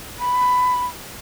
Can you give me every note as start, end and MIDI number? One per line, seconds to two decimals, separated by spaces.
0.18 0.85 83